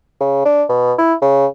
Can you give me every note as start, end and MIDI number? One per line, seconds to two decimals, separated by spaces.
0.21 0.42 49
0.45 0.64 62
0.69 0.93 47
0.98 1.14 64
1.22 1.47 49